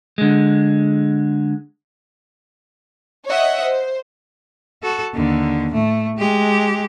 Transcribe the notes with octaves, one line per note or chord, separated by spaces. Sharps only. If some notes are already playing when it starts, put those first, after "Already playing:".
D3 G#3
C#5 D#5 E5 F#5
C5
F#4 A4
D#2 D3
A2 A3
G#3 G4